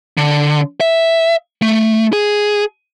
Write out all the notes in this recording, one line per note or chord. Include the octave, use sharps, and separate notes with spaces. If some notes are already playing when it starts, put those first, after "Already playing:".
D3
E5
A3
G#4